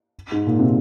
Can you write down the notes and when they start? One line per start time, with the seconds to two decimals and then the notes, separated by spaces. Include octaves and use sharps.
0.32 G#2
0.47 A#2
0.59 C3